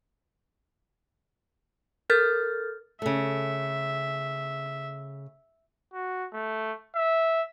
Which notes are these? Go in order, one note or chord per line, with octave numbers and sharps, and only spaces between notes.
A4 A#4 F6 G6 A6
C#3 A3 E5
F#4
A3
E5